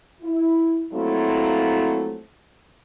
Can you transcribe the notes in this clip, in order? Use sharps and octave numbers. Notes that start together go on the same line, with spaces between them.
E4
F3 F#3 A3 A#3 C4 E4